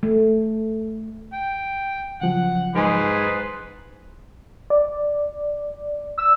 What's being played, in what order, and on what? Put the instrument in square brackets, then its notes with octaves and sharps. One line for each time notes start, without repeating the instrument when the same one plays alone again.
[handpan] A3
[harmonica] G5
[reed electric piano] C#3 F3 F#3 [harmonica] F#5
[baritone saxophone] G#2 [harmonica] G#4 B4 C6
[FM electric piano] D5
[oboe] E6